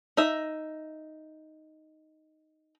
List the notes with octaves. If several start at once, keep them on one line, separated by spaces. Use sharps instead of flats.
D#4 E5